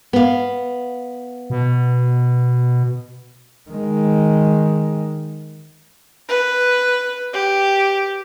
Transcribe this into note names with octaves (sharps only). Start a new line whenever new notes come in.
B3 F5
B2
D#3 G#3
B4
G4